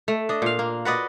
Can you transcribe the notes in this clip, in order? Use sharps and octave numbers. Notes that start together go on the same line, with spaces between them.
A3
D4 D#5
A#2 F5
A#3
F#4 B4 D5 D#5